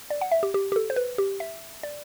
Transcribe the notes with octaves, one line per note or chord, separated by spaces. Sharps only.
D5
F#5
E5
G4
G4
G4
A4
C5
B4
G4
E5
D5